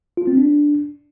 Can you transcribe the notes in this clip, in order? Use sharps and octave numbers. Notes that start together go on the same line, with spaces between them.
F4
C4
D4